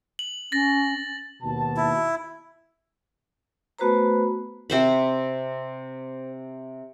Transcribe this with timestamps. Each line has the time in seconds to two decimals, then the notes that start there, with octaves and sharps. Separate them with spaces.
0.19 F#7
0.52 C#4 A6 A#6
1.43 D#2 B2 A5
1.77 E4
3.79 A3 B3 F#4 B4 C5 A#5
4.70 C3 C5 B5